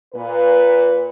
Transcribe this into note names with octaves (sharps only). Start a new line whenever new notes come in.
A#2 B4